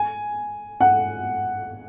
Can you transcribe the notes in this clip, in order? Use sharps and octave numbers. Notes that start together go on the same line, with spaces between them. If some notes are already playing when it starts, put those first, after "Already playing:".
Already playing: G#5
F#5